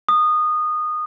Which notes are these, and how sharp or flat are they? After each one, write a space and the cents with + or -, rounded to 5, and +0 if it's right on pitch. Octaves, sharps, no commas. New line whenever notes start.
D#6 -20